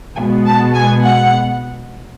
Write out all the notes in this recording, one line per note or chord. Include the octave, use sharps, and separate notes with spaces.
B2 G#3 B3 G#5
A5
G#5
F#5